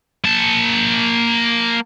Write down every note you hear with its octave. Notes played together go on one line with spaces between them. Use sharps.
A#3 A5